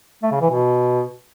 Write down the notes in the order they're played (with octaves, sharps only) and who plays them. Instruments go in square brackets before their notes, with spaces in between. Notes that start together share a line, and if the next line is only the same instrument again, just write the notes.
[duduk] A3
C#3
E3
B2